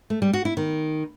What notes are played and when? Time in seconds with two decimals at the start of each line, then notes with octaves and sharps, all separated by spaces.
0.10 A3
0.22 G3
0.33 F#4
0.45 E4
0.57 D#3